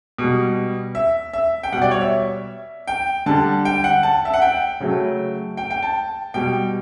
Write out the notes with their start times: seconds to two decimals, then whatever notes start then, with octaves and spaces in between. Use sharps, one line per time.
0.18 B2 G3
0.95 E5
1.33 E5
1.63 G5
1.72 B2 G3 F#5
1.82 D5
1.91 C#5
2.01 E5
2.87 G5
3.26 D3 G3 A5
3.65 G5
3.84 F#5
4.03 A5
4.25 E5
4.34 F#5
4.42 G5
4.80 C#3 F#3 A3
5.57 G5
5.71 G5
5.82 A5
6.34 B2 G3 G5